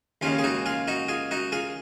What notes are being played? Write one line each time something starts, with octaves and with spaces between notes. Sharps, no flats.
D#2 C#3 G#3 C#4 F4
G#4
D#4 F#4
F4 G#4
D#4 F#4
F4 G#4
D#4 F#4
F4 G#4